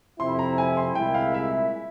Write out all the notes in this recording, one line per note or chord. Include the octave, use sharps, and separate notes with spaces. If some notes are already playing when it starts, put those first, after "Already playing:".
F2 C3 F3 C4 E4 C6
A#5
G#5
C6
C2 A#2 G#3 E4 G5
F5
E5